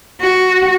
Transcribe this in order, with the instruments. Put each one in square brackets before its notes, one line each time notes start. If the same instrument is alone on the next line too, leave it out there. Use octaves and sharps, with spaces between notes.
[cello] F#4